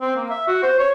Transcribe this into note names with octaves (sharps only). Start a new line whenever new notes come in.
C4
A#3
E5
F#4
C5
C#5